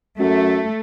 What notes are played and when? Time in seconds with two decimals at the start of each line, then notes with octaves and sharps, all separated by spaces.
0.19 F#2 A3